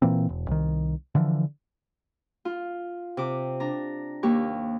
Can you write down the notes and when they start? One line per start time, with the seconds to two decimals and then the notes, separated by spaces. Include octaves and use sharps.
0.02 A#2 E3 A#3 C4
0.29 E1
0.48 C2 D#3
1.15 D3 E3 F3
2.45 F4
3.17 C3 D6
3.60 D4 A#5
4.23 D#2 A#3 G4 C#6